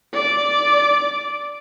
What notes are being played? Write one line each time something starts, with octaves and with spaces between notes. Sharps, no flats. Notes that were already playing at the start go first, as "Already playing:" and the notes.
D5 D6